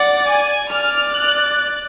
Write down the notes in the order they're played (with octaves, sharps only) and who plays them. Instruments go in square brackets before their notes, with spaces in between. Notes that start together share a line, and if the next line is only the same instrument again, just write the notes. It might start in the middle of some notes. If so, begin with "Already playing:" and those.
Already playing: [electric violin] D5 [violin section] F#5
[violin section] G#5
[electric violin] D5 [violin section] F6
[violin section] F#6